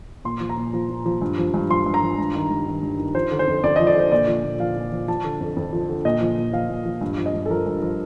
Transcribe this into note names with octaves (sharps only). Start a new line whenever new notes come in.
A#2 C6
F3
A#5
A#2
F3
A#2
F3
G2
F3
G2
F3 C6
G2
A#5
F3
G2
D#3
G2
D#3
G2
D#3
F3 C5
D3
C5
F2
F2 D5
F3 D#5
D5
D3 C5
A#2 D5
F3
A#2
F3 F5
A#2
F3
F3 A5
D3
F2
F2
F3
D3
A#2 D#5
F3
A#2
F3 F5
A#2
F3
G2
F3
D#5
G2
A4
F3 A#4
G2
F3